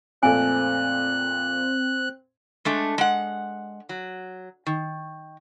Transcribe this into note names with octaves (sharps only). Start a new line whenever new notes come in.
F2 A#2 A3 C4 G#5 F#6
G#3 A3 D4
G#3 F#5
F#3
D#3